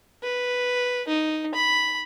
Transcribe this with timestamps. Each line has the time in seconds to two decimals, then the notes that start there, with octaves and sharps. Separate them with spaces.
0.23 B4
1.08 D#4
1.54 B5